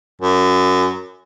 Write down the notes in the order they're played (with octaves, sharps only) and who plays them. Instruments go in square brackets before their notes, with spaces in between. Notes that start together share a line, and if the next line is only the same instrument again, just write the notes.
[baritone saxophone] F#2